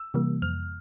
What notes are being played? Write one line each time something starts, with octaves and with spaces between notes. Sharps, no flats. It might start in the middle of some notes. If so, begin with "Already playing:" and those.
Already playing: E6
C3 E3 G3 A#3
F2 F6